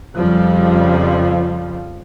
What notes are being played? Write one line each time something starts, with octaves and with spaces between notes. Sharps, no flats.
F2 C#3 F3 G3